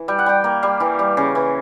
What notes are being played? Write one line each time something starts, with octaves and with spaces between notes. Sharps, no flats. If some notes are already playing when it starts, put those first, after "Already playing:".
Already playing: E3
G3 G5
F#5
G3 G5
A#3
G3 F5
E3
G3
C#3
E3